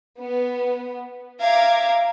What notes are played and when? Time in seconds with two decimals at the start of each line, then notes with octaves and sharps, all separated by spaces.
0.21 B3
1.42 E5 F5 A#5 D6 G#6